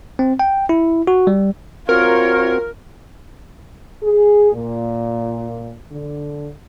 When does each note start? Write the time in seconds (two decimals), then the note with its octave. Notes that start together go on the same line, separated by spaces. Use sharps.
0.19 C4
0.39 G5
0.69 E4
1.07 F#4
1.27 G3
1.89 C4 F4 F#4 A#4 C#5
4.03 G#4
4.52 A#2
5.92 D3